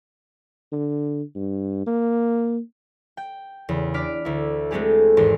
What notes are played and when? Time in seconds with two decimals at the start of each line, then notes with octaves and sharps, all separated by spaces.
0.72 D3
1.35 G2
1.86 A#3
3.17 G5
3.69 E2 C#3
3.94 D4 D5 F6 B6 D7
4.25 D2 E4
4.71 G#3 A3 C4 G4 G#4
5.17 G#1 E2 C6 C7